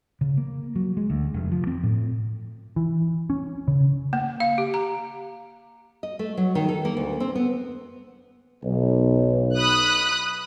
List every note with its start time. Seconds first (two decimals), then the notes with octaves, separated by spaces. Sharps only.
0.21 C#3
0.37 A#3
0.76 F#3
0.97 G#3
1.10 D2
1.34 F1
1.52 F3
1.67 C4
1.83 A2
2.76 E3
3.30 C#4
3.68 C#3
4.13 A#3
4.40 F5
4.58 G4
4.74 A#5
6.03 D#5
6.19 A3
6.37 F#3
6.55 D#3
6.69 A4
6.85 A#3
6.97 D2
7.20 C4
7.35 B3
8.64 B1
9.56 B5 D#6 F#6